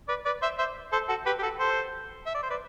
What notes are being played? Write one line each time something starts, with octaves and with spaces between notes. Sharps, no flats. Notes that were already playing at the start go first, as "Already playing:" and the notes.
B4 D5
B4 D5
C5 E5
C5 E5
A4 C5
F#4 A4
G4 B4
G4
F#4 A4
A4 C5
E5
D5
C5
B4 D5